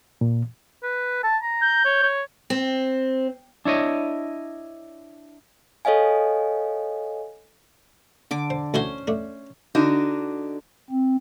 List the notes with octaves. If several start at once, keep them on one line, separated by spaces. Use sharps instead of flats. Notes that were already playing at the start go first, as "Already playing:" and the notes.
A#2
B4
A5
A#5
G6
C#5
C#5
C4
D4 E4 C#5 D#5
A4 C#5 D#5 F5 G#5
D3 D6
C5
D2 C#4 E4 F#4 C5
A3 D4
D3 D4 D#4 F#4
C4